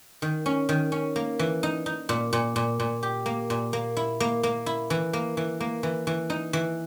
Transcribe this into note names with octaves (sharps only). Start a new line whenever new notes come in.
D#3
C#4
D#3
C#4
A#3
E3
D#4
D#4
A#2
A#2
A#2
A#2
G4
A#3
A#2
A#3
E4
A#3
A#3
E4
E3
A#3
E3
A#3
E3
E3
D#4
E3